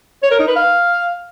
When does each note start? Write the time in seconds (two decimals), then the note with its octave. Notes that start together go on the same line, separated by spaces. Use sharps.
0.23 C#5
0.31 A#4
0.39 D#4
0.48 B4
0.56 F5